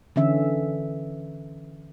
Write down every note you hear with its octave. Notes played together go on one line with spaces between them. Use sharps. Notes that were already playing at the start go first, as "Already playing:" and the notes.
D3 E3 C#4 E5